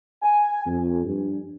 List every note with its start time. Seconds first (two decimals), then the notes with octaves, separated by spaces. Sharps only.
0.22 G#5
0.66 F2
1.05 G2